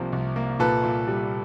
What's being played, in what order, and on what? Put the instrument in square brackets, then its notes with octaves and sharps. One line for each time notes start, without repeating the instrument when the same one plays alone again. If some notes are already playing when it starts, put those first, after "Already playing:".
Already playing: [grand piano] C2 C3 F3 A#3
C2
A#3
A#2 A4 B4
A#2
G3